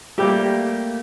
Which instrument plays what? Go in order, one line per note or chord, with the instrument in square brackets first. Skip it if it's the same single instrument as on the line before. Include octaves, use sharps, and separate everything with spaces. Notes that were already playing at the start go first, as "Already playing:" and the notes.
[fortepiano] G3 G4 [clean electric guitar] A3 A#3